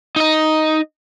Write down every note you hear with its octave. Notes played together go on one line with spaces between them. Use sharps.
D#4 D#5